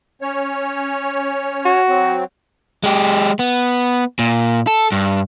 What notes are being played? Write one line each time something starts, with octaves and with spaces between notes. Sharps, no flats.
C#4 C#5
F#4
F#3 C4
G#3 G4
B3
A#2
A4
G2